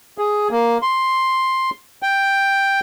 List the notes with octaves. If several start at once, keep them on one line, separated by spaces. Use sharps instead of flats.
G#4
A#3
C6
G5